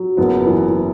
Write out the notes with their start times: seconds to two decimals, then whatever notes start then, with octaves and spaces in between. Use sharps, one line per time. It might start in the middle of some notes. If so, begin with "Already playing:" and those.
Already playing: F#3
0.17 F#1 B3
0.46 E3